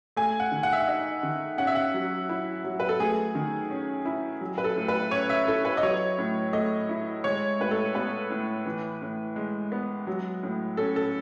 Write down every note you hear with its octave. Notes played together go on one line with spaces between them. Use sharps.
A3 G#5
F#5
D#3
F#5
E5
F#5
D#4
D#3
C#4 F#5
E5
F#5
F#3
E4
F#3
B4
A4
A3 G#4
D#3
C#4
E4
F#3
B4
A4
A2
B4
C#4 C#5
E5
E4 A4
B4
D#5
F#3 C#5
A2
A3 D#5
E4
G#3 C#5
A2 B4
A4
B3 B4
A2
E3
A2
G#3
B3
F#3
A2
C#4 A4
A4